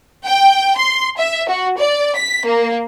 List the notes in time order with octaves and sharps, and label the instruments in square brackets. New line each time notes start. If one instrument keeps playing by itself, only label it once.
[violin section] G5
C6
E5
F#4
D5
B6
A#3